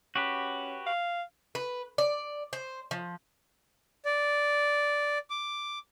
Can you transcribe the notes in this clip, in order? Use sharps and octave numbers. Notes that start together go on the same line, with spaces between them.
C#4 F#4 G4 B4
F5
B4
D5
C5
F3
D5
D6